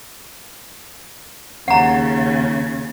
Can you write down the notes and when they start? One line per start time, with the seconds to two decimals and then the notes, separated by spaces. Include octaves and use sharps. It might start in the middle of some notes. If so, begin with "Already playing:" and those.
1.68 D#2 C#3 F#5 A#5